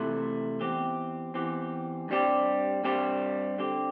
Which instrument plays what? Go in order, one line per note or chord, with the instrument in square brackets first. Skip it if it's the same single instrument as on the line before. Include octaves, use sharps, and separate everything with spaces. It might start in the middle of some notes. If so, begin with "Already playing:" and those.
Already playing: [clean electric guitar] C3 E3 A3 E4
E2 E3 C4 G4
E2 E3 C4 G4
G2 G3 C4 G4
G2 G3 C4 G4
D3 C4 G4